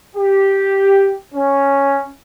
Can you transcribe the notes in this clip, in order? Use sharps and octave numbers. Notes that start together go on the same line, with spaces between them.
G4
C#4